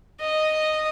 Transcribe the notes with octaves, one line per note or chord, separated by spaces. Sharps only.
D#5